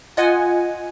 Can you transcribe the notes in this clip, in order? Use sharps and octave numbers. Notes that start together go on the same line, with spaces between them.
F4 D#5 F#5 G#5